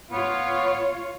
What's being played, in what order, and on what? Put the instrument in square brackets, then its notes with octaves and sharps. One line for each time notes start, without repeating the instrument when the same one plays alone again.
[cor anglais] B3 [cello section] F4 C#5